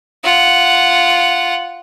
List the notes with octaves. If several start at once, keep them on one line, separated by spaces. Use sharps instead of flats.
F4 F#5